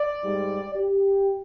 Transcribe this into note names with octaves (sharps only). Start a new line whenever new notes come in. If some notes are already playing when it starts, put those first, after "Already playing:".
Already playing: D5
G#2 G3
G4